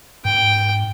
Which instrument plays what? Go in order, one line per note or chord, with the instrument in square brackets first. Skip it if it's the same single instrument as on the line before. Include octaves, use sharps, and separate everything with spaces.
[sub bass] G#2 [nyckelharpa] G5